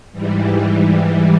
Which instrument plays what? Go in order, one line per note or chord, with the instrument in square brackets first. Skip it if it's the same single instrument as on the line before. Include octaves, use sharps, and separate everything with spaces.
[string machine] G#2 E3 G3